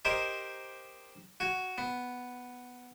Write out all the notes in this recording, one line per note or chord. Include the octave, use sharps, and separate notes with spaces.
G4 A#4 C5 D#5 G#5
F#4 G#5
B3